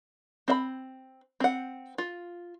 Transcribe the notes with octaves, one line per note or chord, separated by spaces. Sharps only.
C4 E5 B5
C4 F#5
F4